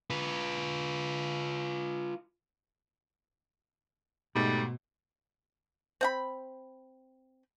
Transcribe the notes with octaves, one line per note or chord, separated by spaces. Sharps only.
F4 B4
G#2 B2 G3 A3 D#4
C4 F#5 B5